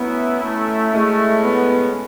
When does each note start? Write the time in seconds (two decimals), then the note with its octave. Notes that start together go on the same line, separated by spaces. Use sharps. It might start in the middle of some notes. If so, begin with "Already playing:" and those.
Already playing: A2 F#3 B3 C#4 E4
0.43 A3
0.93 A2 G#3 A3 C#4
1.43 B3